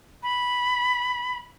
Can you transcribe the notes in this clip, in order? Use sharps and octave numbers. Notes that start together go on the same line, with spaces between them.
B5